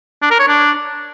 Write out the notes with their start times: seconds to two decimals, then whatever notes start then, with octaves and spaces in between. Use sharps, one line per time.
0.22 D4
0.30 A#4
0.39 C#5
0.48 D4